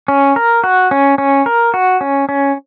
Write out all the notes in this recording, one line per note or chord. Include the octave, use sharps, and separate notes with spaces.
C#4
A#4
F#4
C#4
C#4
A#4
F#4
C#4
C#4